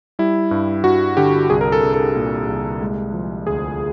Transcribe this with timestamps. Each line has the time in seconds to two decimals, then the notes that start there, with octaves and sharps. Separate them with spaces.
0.19 G3 E4
0.51 G2
0.84 G2 F#4
1.17 D3 G4
1.50 C2 G#4
1.61 A#4
1.72 A4
1.83 C2
1.94 A4
2.16 A#2
2.48 C2
2.81 G#3
3.13 F3
3.46 D2 G#4